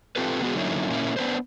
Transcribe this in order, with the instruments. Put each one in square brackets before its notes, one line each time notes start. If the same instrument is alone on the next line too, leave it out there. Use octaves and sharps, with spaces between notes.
[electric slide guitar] C4 F4 G4 A4 B4
D3 B3 F#4 G#4
D3 F#3 A#3 C#4 D#4 E4
A#2 A#3 C#4 E4
B3 D4 B4 C5